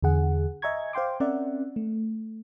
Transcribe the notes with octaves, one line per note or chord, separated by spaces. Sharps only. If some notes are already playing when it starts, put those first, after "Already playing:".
E2 D3 G#4 F#5
D#5 E5 G#5 A#5 C#6 G#6
C5 F5 G5 C6 D6
C4 C#4 A#4 D5 E5 F#5
A3